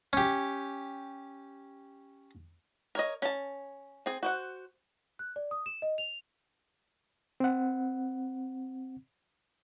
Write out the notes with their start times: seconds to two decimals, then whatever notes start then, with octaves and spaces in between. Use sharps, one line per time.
0.13 C#4 G4
2.95 A#4 C#5 D#5
3.22 C#4 A5
4.06 C4 G#4
4.23 F#4 C5 F#5
5.19 F#6
5.36 D5
5.51 D#6
5.66 E7
5.82 D#5
5.98 F7
7.40 C4 F#5